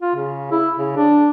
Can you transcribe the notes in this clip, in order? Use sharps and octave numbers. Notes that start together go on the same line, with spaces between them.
F4
C#3
E4
C#3
D4